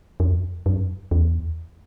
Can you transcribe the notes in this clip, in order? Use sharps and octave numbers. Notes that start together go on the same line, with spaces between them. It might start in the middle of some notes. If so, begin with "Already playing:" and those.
F2
F#2
E2